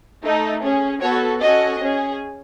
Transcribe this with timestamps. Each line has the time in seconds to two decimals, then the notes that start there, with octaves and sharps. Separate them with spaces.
0.24 A3 D#4 A4
0.63 C#4 G#4
1.02 B3 F#4 A4 C#5
1.41 C#4 F#4 A4 D#5
1.81 C#4 G#4